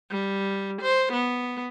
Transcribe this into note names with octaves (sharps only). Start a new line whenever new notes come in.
G3
C5
B3